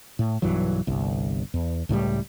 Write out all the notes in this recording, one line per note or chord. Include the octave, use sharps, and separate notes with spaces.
A2
B1 G2 E3 F#3
G1 C2
E2
C#2 A2 E3 G3